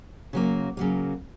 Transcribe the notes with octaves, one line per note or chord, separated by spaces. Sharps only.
C#3 F#3 A#3
C#3 F#3 A#3